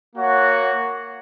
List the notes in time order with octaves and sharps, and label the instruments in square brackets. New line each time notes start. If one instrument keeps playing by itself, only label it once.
[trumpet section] A#3 F#4 C#5 F#5